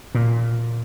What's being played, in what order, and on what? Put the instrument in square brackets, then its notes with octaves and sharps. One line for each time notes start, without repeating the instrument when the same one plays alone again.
[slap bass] A#2